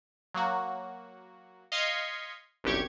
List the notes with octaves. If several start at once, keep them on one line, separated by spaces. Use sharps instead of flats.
F#3 A#3 F#4
D#5 F5 C6 G#6 B6 C#7
G1 C2 F#2 G4 C#6 G#6